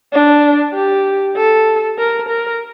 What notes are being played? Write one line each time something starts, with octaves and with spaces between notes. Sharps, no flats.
D4
G4
A4
A#4
A#4